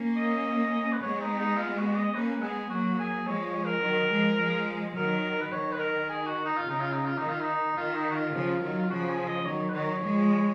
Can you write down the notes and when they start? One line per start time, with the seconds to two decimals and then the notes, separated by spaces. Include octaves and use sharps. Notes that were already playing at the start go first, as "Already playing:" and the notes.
Already playing: A#3 C#4
0.17 D#5
0.93 B4
1.02 G#3 B3 C#5
1.20 D#4
1.39 D#4
1.58 F4
1.77 F#4
1.95 D#5
2.14 A#3 C#4 B4
2.42 G#3 B3 G#4
2.70 F#3 A#3 F#4
2.99 G#4
3.27 F3 G#3 C#5
3.46 C#5
3.65 A#4
3.83 D#3 F#3
4.11 F3 G#3
4.39 F3 G#3
4.96 D#3 F#3 A#4
5.41 B4
5.52 D#3 C#5
5.72 B4
5.80 A#4
6.09 G#4
6.26 F#4
6.45 D#4
6.58 F4
6.65 C#3 D#4
6.81 F4
6.93 D#4
7.06 F4
7.18 D#3 D#4
7.30 F4
7.41 D#4
7.77 D#3 F4
7.96 D#4
8.10 F#4
8.14 F4
8.34 C#3 F3
8.62 D#3 F#3
8.79 F4
8.89 C#3 F3 F#4
9.09 G#4
9.28 D#5
9.46 D#3 F#3 C#5
9.69 B4
9.74 D#3 F#3 C#5
10.03 F3 G#3